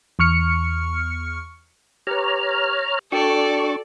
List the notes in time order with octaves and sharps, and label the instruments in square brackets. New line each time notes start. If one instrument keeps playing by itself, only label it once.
[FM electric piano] E2 C#6 F6 C#7
[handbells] G4 B4 [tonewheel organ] C#5 A#5 F6
[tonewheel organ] D4 C#6 [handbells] F#4 G5 [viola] A4 D5